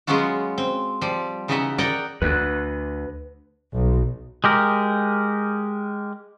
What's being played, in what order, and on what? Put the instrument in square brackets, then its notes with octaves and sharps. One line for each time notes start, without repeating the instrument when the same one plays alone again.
[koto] F#3 G#3 B3 C#4 F4 F#4
C4
F3 G3
C#3 E3 B3 D#4 F#4 E5
A#4 D5 D#5 F#5 G5
[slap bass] D2 [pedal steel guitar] B4 F#6
[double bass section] B1
[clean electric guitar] G#3 G4 A#4